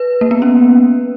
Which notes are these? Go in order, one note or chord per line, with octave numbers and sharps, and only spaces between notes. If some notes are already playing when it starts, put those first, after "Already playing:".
Already playing: B4
A#3
B3
C#4